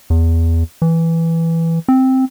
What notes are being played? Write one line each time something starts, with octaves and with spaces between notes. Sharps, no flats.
E2
E3
C4